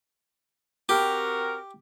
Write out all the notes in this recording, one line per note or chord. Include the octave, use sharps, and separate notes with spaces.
C4 F#4 G4 A#4